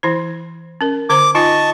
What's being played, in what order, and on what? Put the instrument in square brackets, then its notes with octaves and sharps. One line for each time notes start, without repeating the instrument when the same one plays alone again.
[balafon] E3 E4 C5
C#4 A#4
[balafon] D3 C5 A#5 [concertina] D6
[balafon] D#4 F4 G#5 [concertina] D#5 A5 C#6